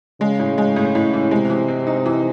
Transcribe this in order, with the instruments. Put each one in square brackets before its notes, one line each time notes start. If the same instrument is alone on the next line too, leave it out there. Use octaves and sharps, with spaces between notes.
[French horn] C#3 [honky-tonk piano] G#3
[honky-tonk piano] A2
G#3
A2
A2
E3
[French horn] C3 [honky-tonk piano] G#3
[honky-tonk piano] E3
C4
D#4
E3